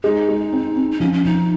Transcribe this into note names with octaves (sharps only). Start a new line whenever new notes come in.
G#3 D#4
G#3
C4
C4
D#4
F3 C#4
C#4
F3 D#4